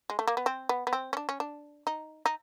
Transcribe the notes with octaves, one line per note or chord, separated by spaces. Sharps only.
G#3
A3
A#3
B3
C4
B3
B3
C4
C#4
D4
C#4
D4
D#4
D#4